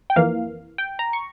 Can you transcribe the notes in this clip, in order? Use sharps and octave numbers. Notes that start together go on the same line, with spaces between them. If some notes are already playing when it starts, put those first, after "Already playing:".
G5
F2 E3 A#3 F5
G5
A#5
C#6